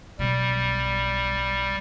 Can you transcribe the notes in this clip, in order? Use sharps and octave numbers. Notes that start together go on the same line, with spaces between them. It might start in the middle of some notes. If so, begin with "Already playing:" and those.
B1 B2 G3